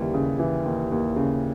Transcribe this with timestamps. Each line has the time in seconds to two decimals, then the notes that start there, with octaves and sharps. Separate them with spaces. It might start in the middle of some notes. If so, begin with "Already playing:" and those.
Already playing: D#2 C#3 E3 G3
0.14 C#3
0.39 E3
0.65 D#2
0.92 D#2
1.16 C#3